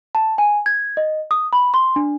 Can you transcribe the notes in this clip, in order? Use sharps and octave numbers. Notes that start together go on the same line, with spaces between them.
A5
G#5
G#6
D#5
D#6
B5
C6
D4